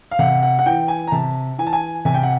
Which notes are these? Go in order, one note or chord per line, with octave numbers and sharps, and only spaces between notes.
F5
C3 F#5
F#5
F#5
E3 G5
G#5
A#5
C3 A5
E3 G#5
A5
G#5
C3 G#5
G5
F#5